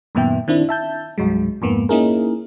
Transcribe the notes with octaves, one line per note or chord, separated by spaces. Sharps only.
F#2 A#2 D#3 B3 E5 G5
D#3 C4 D4 E4
E5 A5 G6
C2 G2 F#3 G#3
F2 G#2 A#3 B3
A#3 C#4 D#4 E4 G#4 A#4